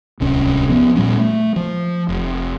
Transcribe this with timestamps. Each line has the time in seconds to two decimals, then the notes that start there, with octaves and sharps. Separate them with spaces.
0.20 D1 C2 C#4
0.69 F3 B3
0.95 A#2 G3 C#4
1.17 A3
1.56 F3
2.09 F1